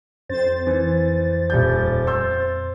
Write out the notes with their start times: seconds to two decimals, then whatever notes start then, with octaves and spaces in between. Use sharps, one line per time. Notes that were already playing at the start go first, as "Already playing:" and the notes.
0.29 F2 C5 A6
0.67 E3
1.50 D#1 G3 G6
2.07 C6 E6 G6